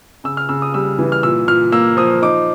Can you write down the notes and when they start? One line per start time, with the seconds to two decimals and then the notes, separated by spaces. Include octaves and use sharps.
0.24 C#3 E6
0.37 F6
0.49 C#3 E6
0.62 D#6
0.74 G3 E6
0.99 E3
1.12 F6
1.23 A#2 E6
1.48 A#2 F6
1.72 A#3 E6
1.97 F3 D#6
2.22 D#4 D6